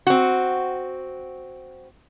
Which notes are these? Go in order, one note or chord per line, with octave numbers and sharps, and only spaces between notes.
C4 F#4